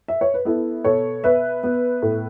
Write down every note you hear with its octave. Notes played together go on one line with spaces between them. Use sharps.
E5
C#5
B4
B3 E4 A4
B2 A4 C#5
B3 B4 E5
B3
A2